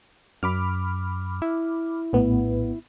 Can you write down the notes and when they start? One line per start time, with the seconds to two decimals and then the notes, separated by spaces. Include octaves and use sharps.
0.43 F#2 B5 D6 F6
1.42 E4
2.13 A#1 A2 B3